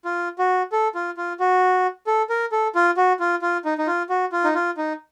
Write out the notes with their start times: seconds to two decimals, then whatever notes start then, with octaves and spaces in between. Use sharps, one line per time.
0.05 F4
0.39 F#4
0.72 A4
0.95 F4
1.17 F4
1.40 F#4
2.07 A4
2.30 A#4
2.52 A4
2.75 F4
2.97 F#4
3.20 F4
3.42 F4
3.65 D#4
3.78 D#4
3.87 F4
4.10 F#4
4.32 F4
4.44 D#4
4.55 F4
4.77 D#4